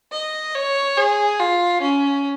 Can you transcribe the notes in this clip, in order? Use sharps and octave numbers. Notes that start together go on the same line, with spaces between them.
D#5
C#5
G#4
F4
C#4